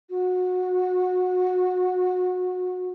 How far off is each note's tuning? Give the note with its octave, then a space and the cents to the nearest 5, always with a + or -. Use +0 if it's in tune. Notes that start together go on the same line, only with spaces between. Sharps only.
F#4 -25